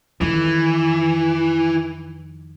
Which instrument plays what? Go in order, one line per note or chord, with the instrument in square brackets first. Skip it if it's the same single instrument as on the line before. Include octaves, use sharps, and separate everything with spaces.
[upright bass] F2 D#3 [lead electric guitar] E3